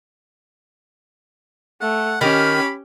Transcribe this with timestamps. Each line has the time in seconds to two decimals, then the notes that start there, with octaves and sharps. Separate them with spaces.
1.81 A3 F#5
2.21 D#3 C#4 G4 B5